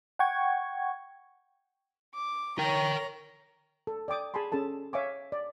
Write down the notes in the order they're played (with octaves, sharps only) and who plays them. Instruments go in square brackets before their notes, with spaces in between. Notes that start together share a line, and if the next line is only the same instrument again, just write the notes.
[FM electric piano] F#5 G5 C#6 G#6
[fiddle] D6
[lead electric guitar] A#4 G5 [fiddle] C#5 A#5
[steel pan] A4
D5 G5 D6 D#6
G#4 G#5 A5 B5 C6
C#4 G#4 A4 A5
C#5 E5 F5 G#5 C#6 D6
D5